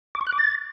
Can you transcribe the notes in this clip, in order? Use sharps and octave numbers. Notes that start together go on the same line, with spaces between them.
D6
C#6
F#6
D6
A6